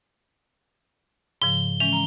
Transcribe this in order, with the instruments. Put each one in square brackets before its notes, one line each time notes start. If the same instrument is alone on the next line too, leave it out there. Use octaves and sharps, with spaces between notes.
[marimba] G#2 C#3 F3 [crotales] G7
[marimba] E3 G#3 C#4 [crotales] F7
[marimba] A#5